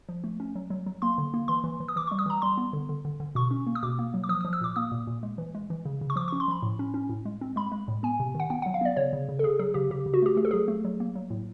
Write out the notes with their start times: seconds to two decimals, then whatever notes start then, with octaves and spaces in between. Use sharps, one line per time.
0.09 F3
0.24 A3
0.40 C#4
0.55 F#3
0.70 F#3
0.86 F#3
1.02 A#3 C6
1.18 D3
1.34 A#3
1.48 E3 C6
1.64 E3
1.80 E3
1.88 D#6
1.96 E3 D6
2.07 G3 C#6
2.19 D#6
2.26 E3 A#5
2.42 G3 C6
2.57 B3
2.73 D3
2.89 D3
3.05 D3
3.20 D3
3.35 B2 C#6
3.51 C#4
3.67 A#3
3.75 D#6
3.83 B2 D6
3.99 A#3
4.14 F#3
4.24 D6
4.29 F3 D#6
4.41 F3 D#6
4.53 E6
4.61 A#2 D6
4.76 A#3 D#6
4.92 A#2
5.07 A#2
5.23 G#3
5.38 E3
5.55 G#3
5.70 E3
5.85 C#3
6.01 C#3
6.10 C#6
6.16 F3 D6
6.28 C#4 C#6
6.40 C6
6.48 F3 B5
6.62 A2
6.79 C#4
6.94 C#4
7.09 A2
7.25 G#3
7.41 C4
7.56 G#3 B5
7.72 G#3
7.88 A2
8.03 B3 G#5
8.20 C3
8.35 D#3
8.40 F#5
8.50 B3 G5
8.62 F#3 F#5
8.74 F5
8.81 B3 D5
8.97 C#3 C#5
9.13 C#3
9.29 C#3
9.39 A4
9.43 C#3 G#4
9.59 F#3 G#4
9.74 C#3 G4
9.90 C#3 G4
10.06 C#3
10.14 F#4
10.22 A3 G4
10.37 A3 G#4
10.45 A4
10.51 F#3 G#4
10.68 A3
10.85 F#3
11.00 A#3
11.15 F#3
11.30 A2